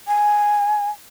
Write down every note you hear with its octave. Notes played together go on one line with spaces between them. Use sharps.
G#5